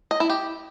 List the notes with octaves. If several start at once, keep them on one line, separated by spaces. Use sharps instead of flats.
D#5
E4
G4